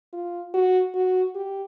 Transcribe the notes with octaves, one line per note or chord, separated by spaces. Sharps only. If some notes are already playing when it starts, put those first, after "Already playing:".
F4
F#4
F#4
G4